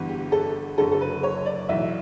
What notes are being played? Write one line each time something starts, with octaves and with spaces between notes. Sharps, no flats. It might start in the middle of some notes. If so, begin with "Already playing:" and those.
Already playing: G1 G2 E3 G3 B3
G4
G4
A4
F#1 F#2 D3 A4
A4
B4
C#5
D5
B1 A2 E3 E5